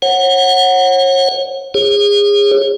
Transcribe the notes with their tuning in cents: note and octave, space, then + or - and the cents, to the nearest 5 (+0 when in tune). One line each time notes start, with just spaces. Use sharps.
C#5 -35 F#5 +0
G#4 -30 C#5 -30